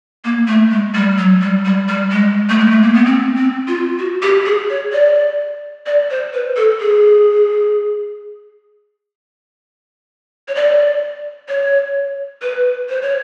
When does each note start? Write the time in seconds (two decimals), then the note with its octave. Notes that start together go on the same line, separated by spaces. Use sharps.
0.25 A#3
0.48 A3
0.71 G#3
0.94 G3
1.18 F#3
1.41 G3
1.65 G3
1.88 G3
2.12 G#3
2.50 A3
2.59 G#3
2.71 A3
2.82 A#3
2.94 B3
3.05 C4
3.37 C4
3.68 F4
3.99 F#4
4.22 G4
4.46 G#4
4.70 C#5
4.92 D5
5.86 D5
6.10 C5
6.33 B4
6.56 A4
6.80 G#4
10.48 C#5
10.55 D5
11.49 C#5
12.42 B4
12.89 C5
13.02 C#5